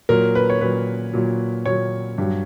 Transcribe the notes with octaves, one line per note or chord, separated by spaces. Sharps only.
A#2 F#3 A#4
B4
C#5
A#2 F#3 B4
A#2 F#3
A#2 F#3 C#5
G2 F#3